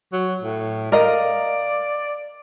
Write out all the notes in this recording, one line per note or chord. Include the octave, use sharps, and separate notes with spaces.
F#3
A2
A#4 D5 D#5 F5